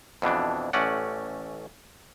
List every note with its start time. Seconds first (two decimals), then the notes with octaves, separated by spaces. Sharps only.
0.22 F2 B2 E3 D4
0.73 A1 A3 C#4 D5 F#5